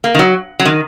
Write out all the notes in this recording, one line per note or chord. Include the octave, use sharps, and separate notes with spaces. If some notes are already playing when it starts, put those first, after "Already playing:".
A#3
D#3
F#3
F#3
D#3